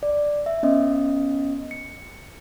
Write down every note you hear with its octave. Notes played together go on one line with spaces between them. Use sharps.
D5
E5
B3 C#4 D#5
C#7